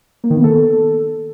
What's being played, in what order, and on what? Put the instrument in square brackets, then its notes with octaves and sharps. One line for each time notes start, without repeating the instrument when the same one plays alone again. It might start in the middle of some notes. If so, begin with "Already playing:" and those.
[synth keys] A#3
D#3
B3
A4